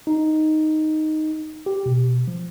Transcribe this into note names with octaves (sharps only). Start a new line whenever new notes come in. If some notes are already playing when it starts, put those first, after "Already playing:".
D#4
G4
B2
F3